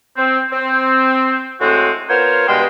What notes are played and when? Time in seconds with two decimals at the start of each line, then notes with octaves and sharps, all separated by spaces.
0.17 C4
0.52 C4
1.61 A2 G#3 C4 F#4
2.10 B3 F4 A#4 C5 C#5
2.48 G2 B2 G#3 G5 C6